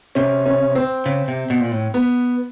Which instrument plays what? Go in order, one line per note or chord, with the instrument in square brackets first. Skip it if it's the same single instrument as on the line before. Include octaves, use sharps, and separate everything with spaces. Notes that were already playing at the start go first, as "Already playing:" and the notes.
[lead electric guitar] C3 [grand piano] C#4
[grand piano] C#4
C4
[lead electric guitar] C#3
C3
B2
A#2
A2
[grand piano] B3